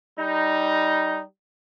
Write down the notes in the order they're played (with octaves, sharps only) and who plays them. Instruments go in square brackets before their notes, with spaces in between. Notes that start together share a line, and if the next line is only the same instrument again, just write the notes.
[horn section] G3 D#4